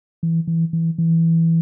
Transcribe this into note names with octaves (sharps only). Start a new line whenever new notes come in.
E3
E3
E3
E3